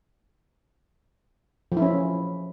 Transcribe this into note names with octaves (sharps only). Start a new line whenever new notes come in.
F3
E4
C#4